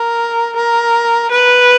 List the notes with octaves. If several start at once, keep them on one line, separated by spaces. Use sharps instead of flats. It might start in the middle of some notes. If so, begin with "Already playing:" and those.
Already playing: A#4
A#4
B4